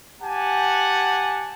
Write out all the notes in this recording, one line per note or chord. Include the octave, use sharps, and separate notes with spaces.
G4 F#5 G#5 A5